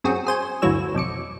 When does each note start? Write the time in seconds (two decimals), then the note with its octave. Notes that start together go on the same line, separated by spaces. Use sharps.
0.04 F#2 C4 F#4 G#4 G5
0.27 G#4 C5 G#5
0.62 G1 D2 E3 F#3 C#5 E6
0.95 B1 F2 D6 C#7